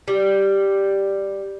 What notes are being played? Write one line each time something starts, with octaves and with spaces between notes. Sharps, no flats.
G3